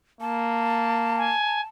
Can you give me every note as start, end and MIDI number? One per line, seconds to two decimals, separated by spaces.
0.21 1.32 58
0.21 1.66 81
1.17 1.61 80